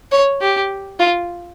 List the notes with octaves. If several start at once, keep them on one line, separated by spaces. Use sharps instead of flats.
C#5
G4
F4